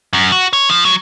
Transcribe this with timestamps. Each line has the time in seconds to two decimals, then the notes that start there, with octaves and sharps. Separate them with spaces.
0.13 F#2
0.32 F#4
0.53 C#5
0.69 F3
0.85 F#3